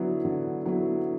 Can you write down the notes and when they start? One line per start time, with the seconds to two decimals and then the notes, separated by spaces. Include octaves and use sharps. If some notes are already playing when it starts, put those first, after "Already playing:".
Already playing: D3 F#3 B3 E4
0.25 D3
0.66 F#3 B3 E4